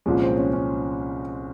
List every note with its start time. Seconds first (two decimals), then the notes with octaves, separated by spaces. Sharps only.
0.06 C2 A#2 F3 G#3 C#4
0.21 C4
0.37 C#4
0.53 C#4